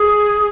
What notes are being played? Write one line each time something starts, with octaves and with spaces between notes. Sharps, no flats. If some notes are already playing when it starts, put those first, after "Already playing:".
Already playing: G#4